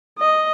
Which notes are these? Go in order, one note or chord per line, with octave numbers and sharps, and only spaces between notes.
D#5